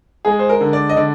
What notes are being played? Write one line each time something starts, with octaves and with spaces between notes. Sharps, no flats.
G#3 G#4
C5
A#4
D3
D5
D#5
D3 D5